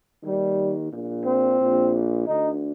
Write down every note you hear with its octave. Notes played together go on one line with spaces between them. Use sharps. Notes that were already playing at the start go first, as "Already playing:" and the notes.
D#2 D#3 G3
A#1 A#2
C4
A#1 A#2
D2 D3 D#4